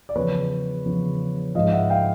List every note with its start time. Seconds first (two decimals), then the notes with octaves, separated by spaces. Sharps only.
0.09 D5
0.15 E2 C#3 F3 B4 C#5
0.86 E2 C#3 F3
1.55 G#2 F3 D#5 F5
1.72 E5 F#5
1.90 F5 G5